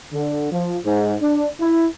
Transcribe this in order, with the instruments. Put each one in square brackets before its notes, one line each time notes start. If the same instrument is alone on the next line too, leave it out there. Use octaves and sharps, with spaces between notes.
[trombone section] D3
F3
G#2
D4
E4